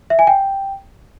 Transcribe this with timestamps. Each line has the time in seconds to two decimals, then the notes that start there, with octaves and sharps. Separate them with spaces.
0.10 E5
0.19 G#5
0.27 G5